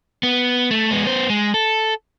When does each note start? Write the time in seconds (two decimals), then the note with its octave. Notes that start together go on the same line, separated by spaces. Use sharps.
0.23 B3
0.71 A3
0.91 G#3 B3
1.05 B3 C5
1.30 G#3
1.54 A4